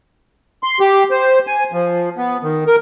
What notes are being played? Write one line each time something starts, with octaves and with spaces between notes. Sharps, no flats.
C6
G4
C5
G#5
F3
B3
D#3
A#4